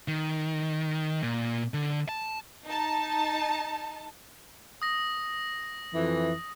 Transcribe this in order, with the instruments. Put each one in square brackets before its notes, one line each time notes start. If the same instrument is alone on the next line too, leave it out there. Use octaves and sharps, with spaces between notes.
[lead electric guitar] D#3
A#2
D3
A5
[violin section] D#4 A5
[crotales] D#6 A#6
[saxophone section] F2 E3